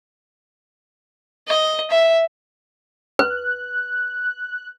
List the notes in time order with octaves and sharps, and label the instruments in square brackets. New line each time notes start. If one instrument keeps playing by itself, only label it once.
[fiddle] D#5
E5
[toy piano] B4 [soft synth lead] F#6